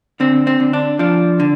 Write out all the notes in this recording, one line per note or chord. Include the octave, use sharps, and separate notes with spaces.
D3 C4
C4
D3
D4
F3 D4
D3